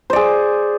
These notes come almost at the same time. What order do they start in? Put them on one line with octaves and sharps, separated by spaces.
C5 D5 G#4